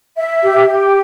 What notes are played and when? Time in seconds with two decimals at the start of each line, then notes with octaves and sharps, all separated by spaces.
0.17 E5
0.43 G4
0.67 G4